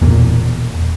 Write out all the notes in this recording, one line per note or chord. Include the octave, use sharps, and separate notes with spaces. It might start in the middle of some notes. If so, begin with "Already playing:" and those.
E1 E2 A#2 A#3